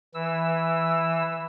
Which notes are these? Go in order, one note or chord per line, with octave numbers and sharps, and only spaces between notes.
E3 E6